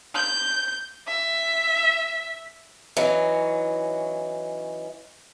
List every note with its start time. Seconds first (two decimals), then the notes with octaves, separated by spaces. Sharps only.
0.15 G6
1.08 E5
2.97 E3 F#3 C#4 D#4